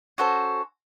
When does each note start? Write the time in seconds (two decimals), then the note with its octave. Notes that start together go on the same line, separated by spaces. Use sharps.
0.18 C#4 F#4 A4 C5